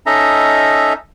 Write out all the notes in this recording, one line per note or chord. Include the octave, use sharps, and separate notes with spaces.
C#4 D#4 A4 D#5 E5 A#5